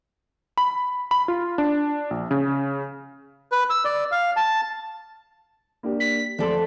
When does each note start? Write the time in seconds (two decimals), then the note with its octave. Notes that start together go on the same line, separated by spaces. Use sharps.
0.58 B5
1.11 B5
1.28 F4
1.58 D4
2.11 A#1
2.31 C#3
3.52 B4
3.70 E6
3.85 D5
4.12 F5
4.37 A5
5.83 A#3 D4 G4
6.00 B6
6.38 F2 A3 A4 D5 C6